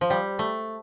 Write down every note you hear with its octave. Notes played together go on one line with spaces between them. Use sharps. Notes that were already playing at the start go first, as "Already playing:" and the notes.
F3
G3
A3